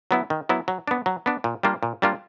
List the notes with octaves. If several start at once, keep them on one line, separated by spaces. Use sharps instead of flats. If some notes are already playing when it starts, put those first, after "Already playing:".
F#3 B3 E4
D#3
F#3 B3 E4
F#3
B3 D4
F#3
B3 D4
A#2
G3 A#3 D4 F4
A#2
G3 A#3 D4 F4